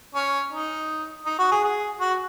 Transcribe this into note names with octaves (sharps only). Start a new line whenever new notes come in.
C#4
D#4
D#4
F#4
G#4
G#4
F#4